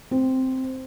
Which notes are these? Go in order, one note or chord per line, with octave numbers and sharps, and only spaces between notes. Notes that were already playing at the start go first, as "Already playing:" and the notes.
C4